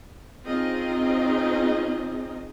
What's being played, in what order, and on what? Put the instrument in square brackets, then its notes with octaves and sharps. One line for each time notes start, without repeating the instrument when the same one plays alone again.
[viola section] C4 C#4 D#4 F4 G#4 D#5